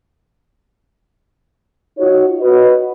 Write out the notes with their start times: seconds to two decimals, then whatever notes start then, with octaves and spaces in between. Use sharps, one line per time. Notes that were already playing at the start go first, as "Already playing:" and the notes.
1.98 D#4 F4 F#4 C#5
2.40 F#4 B4 D#5